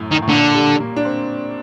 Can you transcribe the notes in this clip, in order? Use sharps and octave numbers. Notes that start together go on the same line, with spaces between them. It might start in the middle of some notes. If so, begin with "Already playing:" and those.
Already playing: F#2 A2
D#3
A2
A#2 D3
G3
A#3
D4
C4